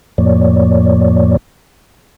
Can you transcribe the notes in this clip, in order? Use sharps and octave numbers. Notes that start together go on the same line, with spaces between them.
F2 A2 F3 A#3 C#5 D5